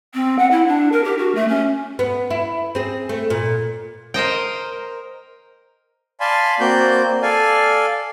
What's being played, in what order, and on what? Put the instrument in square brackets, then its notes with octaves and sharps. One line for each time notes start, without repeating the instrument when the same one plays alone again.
[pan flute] C4
F#5
E4
D4
A#4
G4
F#4
A3
C#4
[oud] B3
E4
C4 G#4
A3
A#2
[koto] A#4 C5 D#5 G5
[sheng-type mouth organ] D5 F5 G#5 A5 B5 C6
A#3 C4 F#4 D5 G6
A4 D5 F5 G#5